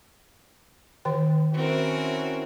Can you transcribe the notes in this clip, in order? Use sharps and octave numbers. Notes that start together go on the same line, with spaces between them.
D#3 B4 G5
C4 C#4 E4 F#4 A#4